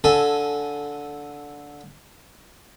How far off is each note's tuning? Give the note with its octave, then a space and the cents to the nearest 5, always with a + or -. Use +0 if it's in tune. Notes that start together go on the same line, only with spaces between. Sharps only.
D3 -15 A4 +0 G#5 +0